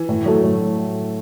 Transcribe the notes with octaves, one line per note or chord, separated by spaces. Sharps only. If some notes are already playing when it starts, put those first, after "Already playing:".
Already playing: E3
A2
F#3 A3
A2